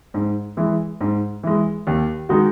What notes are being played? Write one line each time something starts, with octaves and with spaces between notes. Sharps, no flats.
G#2
E3 G#3
G#2
E3 G#3
D#2
D#3 G#3 D#4 F#4